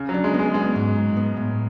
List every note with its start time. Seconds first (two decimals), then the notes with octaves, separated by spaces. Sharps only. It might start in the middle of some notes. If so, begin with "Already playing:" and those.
Already playing: C#3
0.09 F#3
0.14 D4
0.24 G#3
0.34 B3
0.39 G#3
0.54 G#3 B3
0.76 G#2
0.95 G#2
1.17 B3
1.37 A2